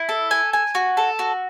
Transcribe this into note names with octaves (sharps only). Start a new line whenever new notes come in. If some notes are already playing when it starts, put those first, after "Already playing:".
Already playing: E4
A4
G#5
G#5
F#4
A4
F#4